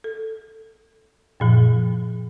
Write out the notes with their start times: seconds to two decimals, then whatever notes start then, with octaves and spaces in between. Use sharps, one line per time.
0.04 A4
1.40 F#2 A#2 F3